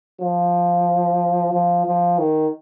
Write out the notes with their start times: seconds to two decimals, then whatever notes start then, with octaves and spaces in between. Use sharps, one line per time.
0.21 F3
1.53 F3
1.86 F3
2.18 D#3